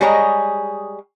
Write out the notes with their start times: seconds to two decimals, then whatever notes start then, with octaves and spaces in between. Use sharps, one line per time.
0.01 G3 G#3 G#4 C#5 D#5 A#5